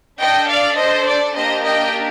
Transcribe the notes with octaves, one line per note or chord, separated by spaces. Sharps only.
D4 A4 D#5 G5
D5 F5
C5 D#5
D5
A#3 D4 G4 C5 D#5
D#5 G5